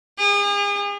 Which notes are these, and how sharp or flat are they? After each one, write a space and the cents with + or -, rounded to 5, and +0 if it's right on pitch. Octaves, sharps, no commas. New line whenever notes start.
G#4 -40